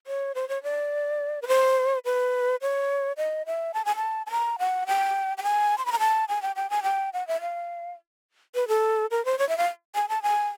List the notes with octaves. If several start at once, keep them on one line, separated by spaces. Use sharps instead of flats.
C#5
C5
C#5
D5
B4
C5
B4
C#5
D#5
E5
A5
G#5
A5
A5
A#5
F#5
G5
G5
G#5
C6
B5
A#5
A5
G#5
G5
G5
G#5
G5
F#5
E5
F5
B4
A4
A#4
C5
C#5
E5
F5
G#5
A5
G#5